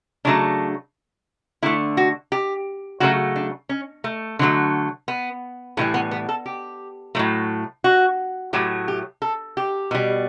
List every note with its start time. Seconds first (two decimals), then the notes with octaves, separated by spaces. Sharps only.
0.25 C#3 F#3 A3 D4
1.62 D3 A3 E4
1.97 F#4
2.32 G4
3.00 C#3 F#3 A3 F#4
3.36 D4
3.69 C#4
4.04 A3
4.39 D3 F#3 A3
5.08 B3
5.77 A2 E3 G3 A3
5.94 B3
6.11 B3
6.29 A4
6.46 G4
7.15 A2 F#3 A3
7.84 F#4
8.53 A2 F#3 A3 G4
8.88 G4
9.22 A4
9.57 G4
9.91 B2 G3